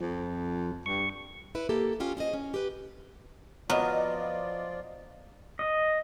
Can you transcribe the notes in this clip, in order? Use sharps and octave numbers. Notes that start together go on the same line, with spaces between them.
F2 F3
G2 C#6
E4 B4
A#3 G4 A4
C#4 F4 G4 A4
C#4 G#4 C5 D#5
C#4
G4 B4
F3 F#3 B3 F4 D5 D#5 F6
D#5